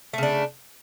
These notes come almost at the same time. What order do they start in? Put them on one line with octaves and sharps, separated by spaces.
A3 C#3 D4